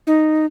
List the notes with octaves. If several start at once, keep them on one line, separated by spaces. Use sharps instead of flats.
D#4